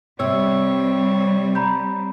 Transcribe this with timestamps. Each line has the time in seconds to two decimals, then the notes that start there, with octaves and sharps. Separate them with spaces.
0.20 C3 G3 C4 C#5 E6
1.55 A#5 B5 G6